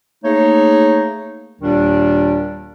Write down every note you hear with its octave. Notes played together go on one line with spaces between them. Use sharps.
A3 A#3 D#4 G#4 C#5
D#2 A#2 D#3 G3 D4